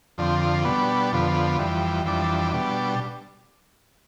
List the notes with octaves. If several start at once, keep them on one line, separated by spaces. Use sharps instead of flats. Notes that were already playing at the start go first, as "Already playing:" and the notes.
F2 D3 F3 C4
B2 G3 B3 D4
F2 D3 F3 B3
F2 E3 G3
F2 E3 G3 D4
B2 G3 D4